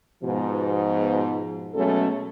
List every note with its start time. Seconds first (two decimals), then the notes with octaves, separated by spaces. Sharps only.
0.24 G#2 B2 F3
1.74 B2 F#3 G#3 A3 C#4 A4